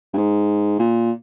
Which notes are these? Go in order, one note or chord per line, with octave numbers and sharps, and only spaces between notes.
G2
G#2
A#2